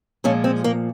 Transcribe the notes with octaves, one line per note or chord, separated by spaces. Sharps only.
A#2 F3 G#3 C#4
C4
A#3